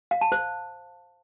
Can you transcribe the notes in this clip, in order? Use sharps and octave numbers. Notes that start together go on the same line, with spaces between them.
F5
A5
C5